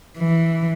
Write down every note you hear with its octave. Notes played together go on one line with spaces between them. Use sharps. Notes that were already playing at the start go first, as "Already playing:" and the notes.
E3